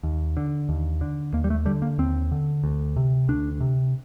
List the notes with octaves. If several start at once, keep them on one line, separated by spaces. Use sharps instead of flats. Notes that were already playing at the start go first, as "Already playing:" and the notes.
D#2
D3
D#2
D3
D#2 A#3
G3
A3
D3 G3
A#3
D#2 C4
D3
D2
C3
D2 D4
C3